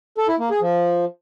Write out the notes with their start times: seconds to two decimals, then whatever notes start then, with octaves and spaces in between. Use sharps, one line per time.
0.18 A4
0.29 E4
0.39 A#3
0.50 G#4
0.61 F3